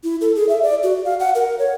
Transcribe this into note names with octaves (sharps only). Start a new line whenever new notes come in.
E4
A4
G#4
E5
D5
F#4
F5
F#5
A#4
C#5